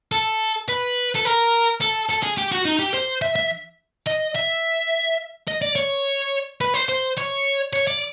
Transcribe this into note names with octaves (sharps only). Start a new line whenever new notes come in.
A4
B4
A4
A#4
A4
A4
G#4
G4
F#4
D#4
G4
C5
E5
E5
D#5
E5
D#5
D5
C#5
B4
C5
C5
C#5
C#5
D5